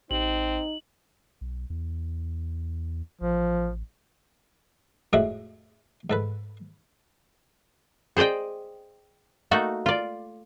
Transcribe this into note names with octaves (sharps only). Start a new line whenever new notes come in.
A1 C4 D#4 F#7
B1
E2
A1 F3
F2 A2 G#3 A3 F#4 D6
G#2 A4 B4
G#4 C5 D5 D#5 G5
A3 A#3 D#4 F#4 A4
F4 D5